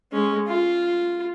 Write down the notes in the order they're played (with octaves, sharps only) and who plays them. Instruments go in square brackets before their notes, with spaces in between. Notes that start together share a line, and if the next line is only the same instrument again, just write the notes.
[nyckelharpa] G#3 C#4
F4